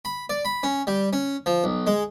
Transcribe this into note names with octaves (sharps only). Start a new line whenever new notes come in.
B5
D5
B5
C#4
G3
C#4
F3
B1
G#3